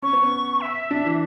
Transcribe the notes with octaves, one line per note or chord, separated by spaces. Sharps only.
C#4 C#6
B3
C#4
E5
D4
E3